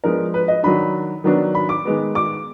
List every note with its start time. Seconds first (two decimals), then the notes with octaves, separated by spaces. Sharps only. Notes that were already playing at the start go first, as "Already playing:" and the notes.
0.04 F3 G#3 B3 D4 A#4
0.34 B4
0.48 D#5
0.63 D#3 F#3 D4 B5
1.24 D#3 F#3 B3 D4
1.55 B5
1.69 D6
1.85 D#3 G#3 B3
2.15 D6